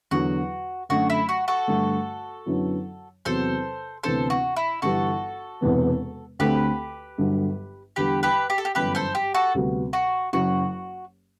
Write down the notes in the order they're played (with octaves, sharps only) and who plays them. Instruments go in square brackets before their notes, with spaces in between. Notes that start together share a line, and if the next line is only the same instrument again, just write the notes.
[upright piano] E2 D3 F#3 [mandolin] F#4
[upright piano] F#2 D3 A3 [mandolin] F#4
[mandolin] E4
F#4
F#4 A4
[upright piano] G2 D3 A3
F#2 D3 F#3 B3 E4
[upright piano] E2 C3 F#3 C4 F#4 [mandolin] A4 C5
[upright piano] D2 C3 E3 B3 D4 [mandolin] A4 C5
[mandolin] F#4
E4
[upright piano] G1 G2 E3 G3 [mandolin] F#4 A4
[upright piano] E1 E2 C3 E3 B3
[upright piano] D2 D3 A3 C4 [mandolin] G4 B4
[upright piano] G1 G2 D3 F#3
[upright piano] E2 D3 G3 [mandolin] G4 B4
[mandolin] G4 B4
G4
A4
G4
[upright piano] G1 F#2 E3 B3 [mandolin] G4 B4
[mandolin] A4 C5
G4
F#4 A4
[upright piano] D2 C3 G3 B3 F#4
[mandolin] F#4
[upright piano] F#1 F#2 F#3 [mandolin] F#4